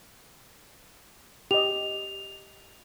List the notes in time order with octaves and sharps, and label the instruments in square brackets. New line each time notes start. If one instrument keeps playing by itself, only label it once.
[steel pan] G4 D#5 [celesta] F7